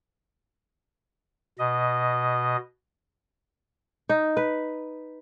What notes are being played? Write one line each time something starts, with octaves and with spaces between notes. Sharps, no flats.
B2 D#5
D#4
B4